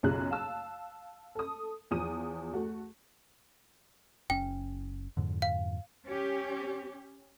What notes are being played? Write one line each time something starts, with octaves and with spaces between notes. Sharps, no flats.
B1 F#2 C#3 F4 G#4 F#6
F5 A5 E6
A4 D#6
E2 F3 D#6 D#7
A3 F#4
F#1 C#4 G5
F2 G#2 D3
F5
C#4 G4